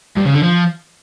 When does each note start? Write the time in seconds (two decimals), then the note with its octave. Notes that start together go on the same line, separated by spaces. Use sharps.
0.17 G2
0.26 C#3
0.35 D3
0.43 F3